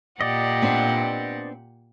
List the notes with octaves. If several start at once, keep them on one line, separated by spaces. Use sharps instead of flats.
A#2 G4 D5 D#5 F#5
B3 C4 D4